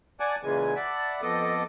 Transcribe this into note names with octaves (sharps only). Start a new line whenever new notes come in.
D5 F#5 G#5 A5 D6
A#2 C#3 E3 G#3 G#5
D5 E5 F#5 A5 B5
F2 B3 A4 D#5 D6